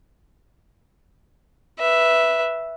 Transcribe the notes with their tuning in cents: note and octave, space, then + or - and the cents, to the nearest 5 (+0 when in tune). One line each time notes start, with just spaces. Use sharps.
B4 -10 E5 +0